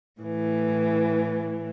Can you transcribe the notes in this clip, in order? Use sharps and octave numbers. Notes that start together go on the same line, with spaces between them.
A2 E3